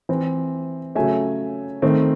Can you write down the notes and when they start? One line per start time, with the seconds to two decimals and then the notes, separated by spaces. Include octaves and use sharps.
0.09 E3 C4
0.95 C#3 F#3 A3 E5 G#5
1.82 D#3 A3 C4